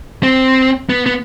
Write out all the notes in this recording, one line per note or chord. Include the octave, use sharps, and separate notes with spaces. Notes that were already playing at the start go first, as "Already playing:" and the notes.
C4
B3
B3